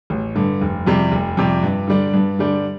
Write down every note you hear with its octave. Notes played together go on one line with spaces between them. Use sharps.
A1
G2 D3
F1
F2 C3 G3
F1
F2 C3 G3
G2
D3 G3 D4
G2
D3 G3 D4